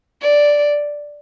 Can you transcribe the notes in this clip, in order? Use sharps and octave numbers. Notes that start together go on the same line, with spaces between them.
D5